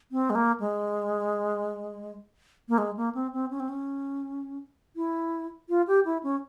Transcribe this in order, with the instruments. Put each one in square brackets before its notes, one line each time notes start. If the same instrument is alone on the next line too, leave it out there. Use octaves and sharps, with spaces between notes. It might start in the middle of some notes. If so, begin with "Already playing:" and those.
[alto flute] C4
G#3
A#3
G#3
A#3
G#3
A#3
C4
C4
C#4
C4
C#4
E4
F4
G4
E4
C#4